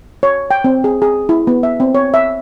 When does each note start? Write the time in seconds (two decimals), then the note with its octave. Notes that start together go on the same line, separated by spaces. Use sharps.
0.23 C#5
0.51 G5
0.64 C4
0.84 G#4
1.02 G#4
1.29 E4
1.47 B3
1.63 E5
1.80 C4
1.95 C#5
2.14 E5